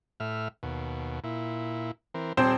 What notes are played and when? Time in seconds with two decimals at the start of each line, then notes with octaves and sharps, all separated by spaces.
0.20 A2 E5 F6
0.63 D#2 B2
1.24 A#2 E4
2.14 E3 C4 A#4
2.37 D#1 C4 G4 C5 C6